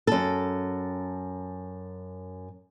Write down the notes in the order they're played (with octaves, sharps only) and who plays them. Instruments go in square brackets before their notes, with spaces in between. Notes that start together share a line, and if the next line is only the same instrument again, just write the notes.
[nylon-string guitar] F#2 A4